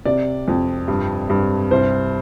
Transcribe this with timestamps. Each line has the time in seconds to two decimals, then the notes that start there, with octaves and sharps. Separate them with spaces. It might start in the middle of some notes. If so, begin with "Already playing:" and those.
0.05 C3 D5
0.48 F2
0.88 G2
1.30 G2
1.71 C2 C5